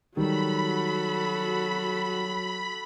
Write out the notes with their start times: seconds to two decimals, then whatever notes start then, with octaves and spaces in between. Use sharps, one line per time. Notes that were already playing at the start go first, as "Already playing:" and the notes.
0.17 D#3 F#3 G3 F#4 A4 B5